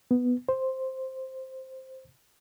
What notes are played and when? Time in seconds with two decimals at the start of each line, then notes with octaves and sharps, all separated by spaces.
0.11 B3
0.49 C5